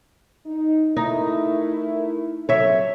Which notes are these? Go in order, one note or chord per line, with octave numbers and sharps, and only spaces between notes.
D#4
A3 D#4 E4 A#4
C3 F#3 A4 C#5 E5